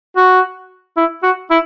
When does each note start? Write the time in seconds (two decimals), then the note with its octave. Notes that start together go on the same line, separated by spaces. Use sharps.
0.16 F#4
0.97 E4
1.23 F#4
1.51 E4